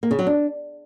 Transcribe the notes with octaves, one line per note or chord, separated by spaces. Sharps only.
A#3
C#3
F#3
D4